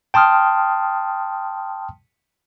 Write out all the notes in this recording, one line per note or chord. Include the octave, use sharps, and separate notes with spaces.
G5 A5 C6 D#6 F6